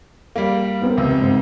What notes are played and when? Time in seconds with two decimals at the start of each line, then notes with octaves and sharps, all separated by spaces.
0.36 G3 A#3
0.82 B3 C4 A#4
0.97 C#2 C3
1.22 G#2